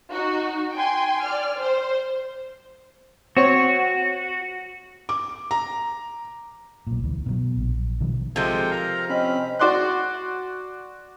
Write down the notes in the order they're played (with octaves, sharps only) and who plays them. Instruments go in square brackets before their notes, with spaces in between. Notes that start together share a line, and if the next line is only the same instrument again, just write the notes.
[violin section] D#4 F#4
G5 G#5 C6
D5 F6
C5
[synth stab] C4 C#5 C#6 [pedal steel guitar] F#4
[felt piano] D6
A#5
[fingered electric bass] B1 A#2
D1 D2 E3
B2 E3 F#3
A#1
B2 D#3 F3 G3
[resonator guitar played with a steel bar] C3 F3 [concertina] G#3 A4 G5
[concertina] A#4 F5 A#5
[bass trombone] C4 [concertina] C#4 B5 [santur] D#5
[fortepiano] F#4 D5 C6 F#6